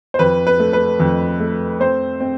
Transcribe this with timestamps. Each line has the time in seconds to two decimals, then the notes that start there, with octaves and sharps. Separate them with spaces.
0.14 C5
0.19 F2 B4
0.47 B4
0.60 A3
0.73 B4
1.00 F2
1.40 A3
1.80 C4 C5
2.20 C4